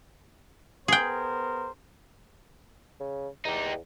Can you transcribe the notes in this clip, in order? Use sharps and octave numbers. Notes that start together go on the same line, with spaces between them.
B3 G#4 A#4 C5 G5
C#3
E2 D#4 G4